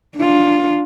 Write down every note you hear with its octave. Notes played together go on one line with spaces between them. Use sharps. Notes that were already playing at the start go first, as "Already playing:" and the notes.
D4 F4